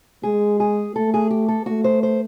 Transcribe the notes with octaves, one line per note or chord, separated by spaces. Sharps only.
G#3 G#4
G#4
A3 A4
G#4
G4
A4
A3 F#4
C5
C5